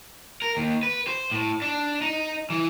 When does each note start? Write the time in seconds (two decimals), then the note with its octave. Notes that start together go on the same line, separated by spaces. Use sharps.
0.42 A#4
0.57 D#2
0.83 B4
1.07 C5
1.32 A2
1.62 D4
2.01 D#4
2.50 E3